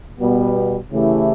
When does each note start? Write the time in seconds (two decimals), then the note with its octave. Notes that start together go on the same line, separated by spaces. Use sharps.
0.19 B2 G3 B3
0.90 C#3 E3 A3 E4 G4